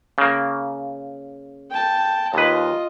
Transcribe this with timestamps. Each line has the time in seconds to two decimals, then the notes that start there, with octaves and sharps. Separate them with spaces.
0.18 C#3 A#3
1.70 G5 A5
2.34 D#2 F4 B4 D#5